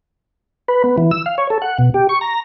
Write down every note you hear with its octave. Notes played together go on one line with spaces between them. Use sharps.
B4
B3
E3
E6
F5
C#5
A4
F#5
B2
G4
C#6
A#5